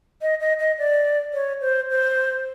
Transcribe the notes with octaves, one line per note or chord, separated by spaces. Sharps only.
D#5
D#5
D#5
D5
C#5
C5
C5